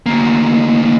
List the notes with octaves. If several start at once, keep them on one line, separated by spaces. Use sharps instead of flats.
D2 A#3